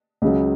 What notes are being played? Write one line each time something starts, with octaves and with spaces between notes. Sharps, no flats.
C#2 C#3 F#3